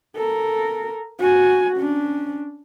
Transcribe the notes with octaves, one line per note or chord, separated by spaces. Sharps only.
A4 A#4
F#4 G#5
C#4 D4